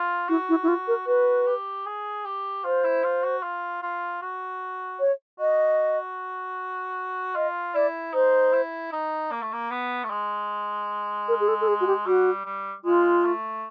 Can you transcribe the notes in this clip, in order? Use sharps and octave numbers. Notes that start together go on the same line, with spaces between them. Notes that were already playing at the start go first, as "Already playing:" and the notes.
Already playing: F4
E4 F#4
E4
E4
F4
A#4
F#4 B4
G4
G#4
G4
F4 C5
E4
F4
F#4
F4
F4
F#4
C#5
F#4 D#5
F4 D#5
E4 D5
D#4 C5
E4
D#4
A#3
A3
A#3
B3
A3
G#3
A#4
G#4
A4
A4
G#4
F#4
G4
G3 F#4
G3
G#3 F4
A3